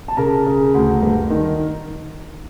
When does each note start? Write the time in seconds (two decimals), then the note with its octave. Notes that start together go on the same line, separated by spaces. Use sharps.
0.08 A5
0.17 C#3 A#4 A#5
0.47 C#3
0.74 D2
1.03 G2
1.30 D#3